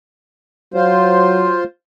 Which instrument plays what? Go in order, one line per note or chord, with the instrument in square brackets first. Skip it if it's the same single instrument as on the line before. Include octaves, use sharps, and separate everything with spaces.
[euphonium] F#3 [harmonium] F4 C5